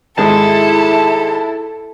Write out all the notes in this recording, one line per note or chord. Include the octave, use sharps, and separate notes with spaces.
G#1 G#3 E4 G#4 A4 A5